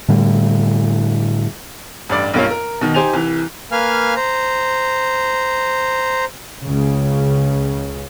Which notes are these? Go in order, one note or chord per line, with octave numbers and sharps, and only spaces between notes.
A2 D3 G3
A1 G2 D5 D6
B1 G2 A#3 F4 C#5 F5
A#4
B2 D#3
D#4 G4 C5 G#5 F7
C2 E3
A#3 B4 F5 G#5 F6
C5 A#5
C#2 C#3